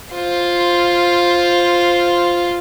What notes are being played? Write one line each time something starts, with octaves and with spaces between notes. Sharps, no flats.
F4 C5